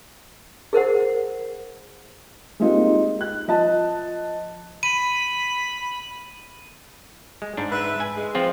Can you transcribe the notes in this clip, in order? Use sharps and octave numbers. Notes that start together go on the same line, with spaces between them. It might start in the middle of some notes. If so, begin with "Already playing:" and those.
G#4 A#4 C5 F#5
G#3 A#3 C4 D#4 F4 G4
F#6
F3 D#5 A5
B5 D#7
G#3
G#2 D4
B4 E5
G#5
G#3
F3 C4 F4